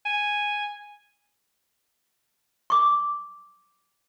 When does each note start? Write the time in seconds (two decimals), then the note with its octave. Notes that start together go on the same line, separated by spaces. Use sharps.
0.05 G#5
2.70 C#6 D6